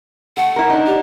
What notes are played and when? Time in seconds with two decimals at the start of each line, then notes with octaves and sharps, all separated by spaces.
0.37 A3 A4 F#5
0.56 E4 A#4
0.70 D4 D#4
0.86 G4